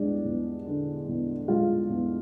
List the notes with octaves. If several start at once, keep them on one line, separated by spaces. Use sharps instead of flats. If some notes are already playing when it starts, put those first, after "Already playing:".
Already playing: E2 G#3 D4 D5
E2
D3
E2
G#3 F4 F5
E2